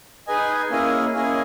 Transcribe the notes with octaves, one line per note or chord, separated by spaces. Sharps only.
D#4 G#4 B4 D#5 G#5
A#3 C#4 E4 G#4 D#5
A#3 C#4 E4 G#4 D#5